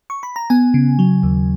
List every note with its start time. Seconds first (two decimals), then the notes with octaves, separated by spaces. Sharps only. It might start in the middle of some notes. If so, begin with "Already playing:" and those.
0.10 C#6
0.23 B5
0.36 A#5
0.50 B3 G#5
0.74 C#3
0.99 F#3
1.23 D#2